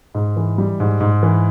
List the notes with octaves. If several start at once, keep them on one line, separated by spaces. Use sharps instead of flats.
G#2
E3
G3
G#2
G#2
E3